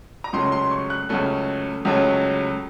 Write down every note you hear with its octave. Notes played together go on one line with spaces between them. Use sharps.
A#5
C#2 C#3 F#3 A3 C#4 C6
C6
C#6
F#6
C#2 C#3 F#3 A3 C#4
C#2 C#3 F#3 A3 C#4